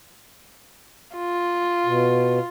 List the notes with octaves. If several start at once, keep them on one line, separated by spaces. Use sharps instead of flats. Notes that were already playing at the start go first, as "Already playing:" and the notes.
F4
B2